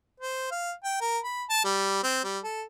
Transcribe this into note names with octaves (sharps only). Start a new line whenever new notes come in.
C5
F5
G5
A#4
B5
A5
G3
C4
G3
A4